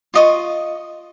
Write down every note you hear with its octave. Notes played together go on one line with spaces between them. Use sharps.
F4 D#5 C#6